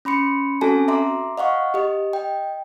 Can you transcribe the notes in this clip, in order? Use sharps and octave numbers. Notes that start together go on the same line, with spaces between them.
C#4 B5 C6 C#7
C4 C#4 F#4 A4 G#5 A5
E5 A#5 C6 D6
D#5 F5 F#5 C#6
G4 D#5
D#5 G5